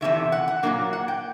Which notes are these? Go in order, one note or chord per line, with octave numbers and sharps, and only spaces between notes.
E2 C3 E3 A3 E5
F#5
F#5
A#2 F#3 A#3 D4
F#5
G5